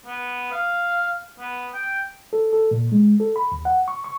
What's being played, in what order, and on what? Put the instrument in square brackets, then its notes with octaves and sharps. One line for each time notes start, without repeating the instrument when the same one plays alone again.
[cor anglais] B3
F5
B3
G5
[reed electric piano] A4
A4
A#2
G#3
A4
B5
D#2
F#5
C#6
C#6